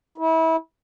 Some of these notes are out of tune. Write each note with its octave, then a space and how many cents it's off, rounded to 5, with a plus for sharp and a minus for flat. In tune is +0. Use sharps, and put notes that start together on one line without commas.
E4 -30